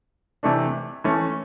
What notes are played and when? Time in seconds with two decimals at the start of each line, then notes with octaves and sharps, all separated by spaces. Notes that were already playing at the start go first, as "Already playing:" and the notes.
0.43 C3 E3 A3 D4
1.04 E3 A3 C#4